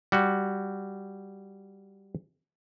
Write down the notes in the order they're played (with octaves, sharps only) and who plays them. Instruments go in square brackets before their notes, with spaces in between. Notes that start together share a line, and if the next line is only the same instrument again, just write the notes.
[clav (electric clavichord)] G3 F#4